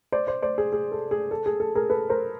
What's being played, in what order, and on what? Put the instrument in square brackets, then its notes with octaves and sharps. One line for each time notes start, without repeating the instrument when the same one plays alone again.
[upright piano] C5 D5
C5 D5
C5 D5
G#4
G#4
A4
G#4
A4
G#4
A4
G#4 A#4
A4 B4
A#4 C5